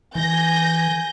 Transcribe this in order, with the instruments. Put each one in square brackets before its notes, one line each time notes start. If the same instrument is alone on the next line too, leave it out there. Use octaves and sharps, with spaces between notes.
[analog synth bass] E3 [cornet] G#5 [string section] G6 A#6